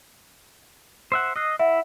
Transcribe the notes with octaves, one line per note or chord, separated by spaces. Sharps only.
C5 E5 F#5
D#5 E6 F#6 C7
E4 E5 F#5